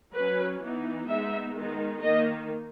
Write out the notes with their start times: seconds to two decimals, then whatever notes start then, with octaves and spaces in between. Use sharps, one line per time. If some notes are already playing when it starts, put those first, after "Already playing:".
0.14 F#3 C#4 B4
0.61 E3 B3 D#4
1.08 G#3 B3 D#4 E5
1.55 D#3 G#3 B3 D#4
2.02 D#3 A#3 D#4 D#5